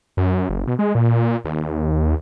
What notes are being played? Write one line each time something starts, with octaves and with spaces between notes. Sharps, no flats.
F#2
F#1
B2
G#3
A#2
D#2